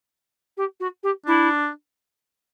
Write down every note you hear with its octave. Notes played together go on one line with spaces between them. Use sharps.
G4
F#4
G4
D4 E4